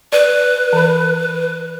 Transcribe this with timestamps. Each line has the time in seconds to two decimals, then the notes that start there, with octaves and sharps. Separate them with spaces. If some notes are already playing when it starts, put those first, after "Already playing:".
0.13 B4 D5
0.73 E3 B5